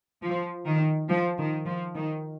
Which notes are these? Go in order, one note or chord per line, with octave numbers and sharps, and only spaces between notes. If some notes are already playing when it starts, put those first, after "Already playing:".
F3
D#3
F3
D#3
F3
D#3